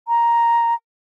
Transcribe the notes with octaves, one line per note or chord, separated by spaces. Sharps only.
A#5